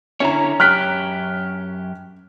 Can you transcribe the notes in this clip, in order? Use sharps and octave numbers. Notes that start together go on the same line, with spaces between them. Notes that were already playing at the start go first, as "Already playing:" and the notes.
D3 C#4 E4 C#5 A#5
F#2 G4 F6 F#6 B6